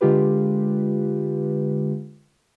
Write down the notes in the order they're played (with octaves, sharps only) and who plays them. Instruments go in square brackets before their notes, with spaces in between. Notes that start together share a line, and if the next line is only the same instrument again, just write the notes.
[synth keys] D3 G#3 F4 G4 B4